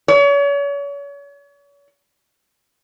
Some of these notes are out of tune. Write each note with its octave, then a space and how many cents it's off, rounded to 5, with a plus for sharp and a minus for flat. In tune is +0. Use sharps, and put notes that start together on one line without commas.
C#5 +40